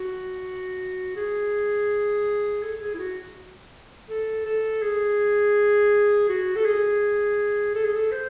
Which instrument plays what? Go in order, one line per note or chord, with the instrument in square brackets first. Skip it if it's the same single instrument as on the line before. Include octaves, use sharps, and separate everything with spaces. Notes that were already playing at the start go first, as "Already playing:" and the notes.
Already playing: [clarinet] F#4
G#4
A4
G#4
E4
F#4
A4
A4
G#4
F#4
A4
G#4
A4
G#4
A4
C5